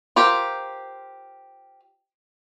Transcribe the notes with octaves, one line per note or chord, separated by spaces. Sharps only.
F4 G4 A#4 C5